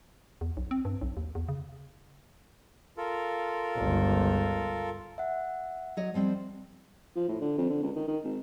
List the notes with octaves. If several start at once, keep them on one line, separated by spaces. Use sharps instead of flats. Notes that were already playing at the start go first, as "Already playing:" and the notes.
E2
B1
C4
G2
B1
D#2
E2
C#3
F4 A4 A#4
G1 C#2
E5 F#5
F#3 C#5 D#5
F3 G3 C4
F3
A2
D3
F2
D3
C#2
D#3
D#3
G#1